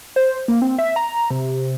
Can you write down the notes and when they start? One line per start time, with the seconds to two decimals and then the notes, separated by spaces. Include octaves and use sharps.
0.16 C5
0.48 A#3
0.62 C4
0.78 E5
0.96 A#5
1.31 C3